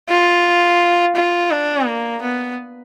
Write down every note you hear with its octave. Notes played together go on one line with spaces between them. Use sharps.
F4
F4
D4
A#3
B3